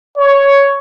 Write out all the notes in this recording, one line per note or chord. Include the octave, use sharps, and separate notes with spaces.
C#5